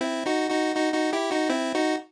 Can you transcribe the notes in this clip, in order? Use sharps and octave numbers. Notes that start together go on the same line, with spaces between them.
C4 E4
D#4 F#4
D#4 F#4
D#4 F#4
D#4 F#4
E4 G4
D#4 F#4
C4 E4
D#4 F#4